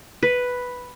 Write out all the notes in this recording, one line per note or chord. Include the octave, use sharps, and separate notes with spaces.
B4